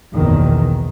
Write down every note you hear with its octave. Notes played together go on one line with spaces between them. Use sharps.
F#1 B1 E2 B2 D#3